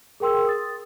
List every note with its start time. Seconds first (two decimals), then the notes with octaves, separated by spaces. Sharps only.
0.20 G#4 A#4 G5 C6 E6
0.47 D#6 A6